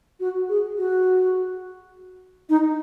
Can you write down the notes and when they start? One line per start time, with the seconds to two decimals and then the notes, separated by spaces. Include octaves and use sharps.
0.20 F#4
0.49 G#4
0.77 F#4
2.49 D#4